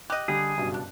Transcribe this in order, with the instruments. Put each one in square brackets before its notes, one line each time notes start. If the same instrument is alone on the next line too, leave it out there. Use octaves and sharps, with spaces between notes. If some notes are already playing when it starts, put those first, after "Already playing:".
[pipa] G4 D#5 [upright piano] F#6
[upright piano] D3 G3 [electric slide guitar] G#4
[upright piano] F#1 G2 B2
[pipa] D4